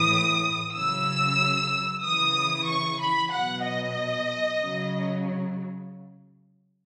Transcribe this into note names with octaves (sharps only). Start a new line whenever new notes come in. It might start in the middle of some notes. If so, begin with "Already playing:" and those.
Already playing: A2 E3 D#6
C#3 F#3 E6
C#3 E3 D#6
C#6
B5
B2 F#3 F#5
D#5
C#3 F#3